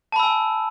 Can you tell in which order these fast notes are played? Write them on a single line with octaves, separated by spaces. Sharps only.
A5 B5 E6 G#5